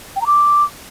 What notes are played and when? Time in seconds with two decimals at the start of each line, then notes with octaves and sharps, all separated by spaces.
0.16 G5
0.21 A#5
0.27 D6